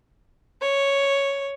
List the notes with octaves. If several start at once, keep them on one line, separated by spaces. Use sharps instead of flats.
C#5